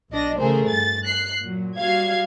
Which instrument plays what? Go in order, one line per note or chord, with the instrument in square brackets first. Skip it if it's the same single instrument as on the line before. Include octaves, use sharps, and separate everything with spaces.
[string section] B1 D4 D#5 A#6
C#3 E3 A3 G#4 A#4 C5
G2 A6
F#6 C7
A#2 F#3
G3 F#4 F5 G#6